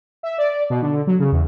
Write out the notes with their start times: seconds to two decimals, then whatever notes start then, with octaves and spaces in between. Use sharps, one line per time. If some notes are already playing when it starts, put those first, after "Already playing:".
0.23 E5
0.38 D5
0.70 B2
0.82 D3
1.07 F#3
1.19 C#3
1.32 E2